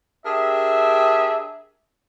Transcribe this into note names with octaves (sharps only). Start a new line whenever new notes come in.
D4 G4 G#4 A#4 E5